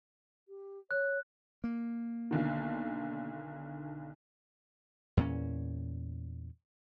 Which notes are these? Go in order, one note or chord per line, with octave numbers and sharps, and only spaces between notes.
G4
C#5 F#6
A#3
B1 D3 D#3
E2 A#2 B3 C#4